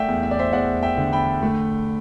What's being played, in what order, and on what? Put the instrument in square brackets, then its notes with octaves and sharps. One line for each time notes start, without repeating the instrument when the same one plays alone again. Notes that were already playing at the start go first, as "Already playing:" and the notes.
Already playing: [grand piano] A3 D5 E5 F#5 G5
E2
E5
D5
C5 E5
E2 D5 F#5
E5 G5
D3
G5 B5
A3